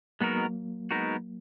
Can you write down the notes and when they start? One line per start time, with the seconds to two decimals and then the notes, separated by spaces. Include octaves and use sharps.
0.21 F#3 G#3 A#3 B3 D#4 F#4 A#4
0.91 G#3 B3 D#4 F#4 A#4